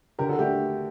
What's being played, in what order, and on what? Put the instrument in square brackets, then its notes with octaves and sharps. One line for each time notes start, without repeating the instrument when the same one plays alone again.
[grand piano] D3 [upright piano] G4 A#4
[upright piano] F#4 A4
[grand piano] A3 D4 [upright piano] G4